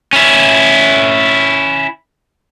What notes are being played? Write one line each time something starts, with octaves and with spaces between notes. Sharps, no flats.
C#4 E4